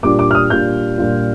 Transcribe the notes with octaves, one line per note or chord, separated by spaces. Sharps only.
A#2 G3 D4 F4 D6
D6
F6
D#6
A#2 G3 D4 F4 G6
A#2 G3 D4 F4